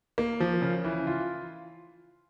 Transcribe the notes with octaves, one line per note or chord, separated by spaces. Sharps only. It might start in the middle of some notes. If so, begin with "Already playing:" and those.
A#3
F3
C#3
E3
F4